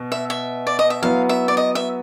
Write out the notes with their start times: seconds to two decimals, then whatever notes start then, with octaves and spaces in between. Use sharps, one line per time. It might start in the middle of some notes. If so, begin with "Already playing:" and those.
Already playing: B2
0.12 E5
0.30 E5
0.67 D5
0.79 D#5
0.90 E5
1.02 F#3 B3 E4 F5
1.29 E5
1.48 D5
1.57 D#5
1.75 E5